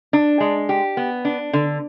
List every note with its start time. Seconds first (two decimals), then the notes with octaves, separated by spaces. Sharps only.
0.13 D4
0.40 G#3
0.69 G4
0.97 B3
1.25 D4
1.53 D3